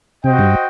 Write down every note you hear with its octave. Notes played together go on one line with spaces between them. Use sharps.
C3 F#4 C5 D#5 G5
G2